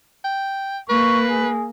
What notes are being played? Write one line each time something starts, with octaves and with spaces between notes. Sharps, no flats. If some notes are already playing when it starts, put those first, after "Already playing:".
G5
A#3 B4 C#6
G#4